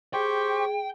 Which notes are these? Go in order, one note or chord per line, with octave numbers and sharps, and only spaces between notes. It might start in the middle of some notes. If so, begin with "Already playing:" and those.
G4 G#4 C5 G5 C#6